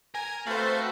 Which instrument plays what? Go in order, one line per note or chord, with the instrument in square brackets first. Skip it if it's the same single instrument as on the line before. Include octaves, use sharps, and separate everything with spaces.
[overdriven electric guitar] A#4 A#5 [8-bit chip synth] G#5
[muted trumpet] A3 [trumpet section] C4 A4 B4 [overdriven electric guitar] F#4 [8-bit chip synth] C5 F5